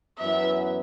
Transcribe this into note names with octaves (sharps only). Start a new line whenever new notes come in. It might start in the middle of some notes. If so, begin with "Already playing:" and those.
F#2 E3 B3 E5